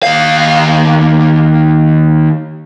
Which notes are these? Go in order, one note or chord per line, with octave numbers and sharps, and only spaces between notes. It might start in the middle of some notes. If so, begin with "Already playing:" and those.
D#2 F5